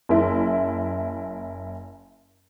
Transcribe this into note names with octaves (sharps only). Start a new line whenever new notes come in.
F#1 E4